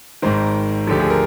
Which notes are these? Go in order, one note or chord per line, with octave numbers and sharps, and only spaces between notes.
G#1 G#2 D#3 C5
D2 D3 F3 G4
G#4
A#4